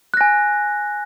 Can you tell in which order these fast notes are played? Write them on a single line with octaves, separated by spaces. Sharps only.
F#6 A#6 G#5